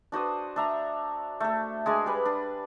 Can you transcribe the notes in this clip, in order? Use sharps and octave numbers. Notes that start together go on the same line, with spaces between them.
D4 F#4 C5 D#6
D4 E5 A#5
A3 A4
G#3 D4 G#4 G#5
G3 B4
D4